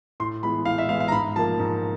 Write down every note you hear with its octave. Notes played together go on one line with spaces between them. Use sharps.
A2 C6
E3 G#3 B3 B5
A2 F5
E5
E3 G#3 B3 F5
F5
A#5
G#2 B5
F3 A#3 A5
G#2